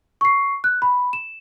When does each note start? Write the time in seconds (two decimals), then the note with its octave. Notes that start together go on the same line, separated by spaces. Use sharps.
0.21 C#6 C7
0.64 F#6
0.82 B5
1.13 E7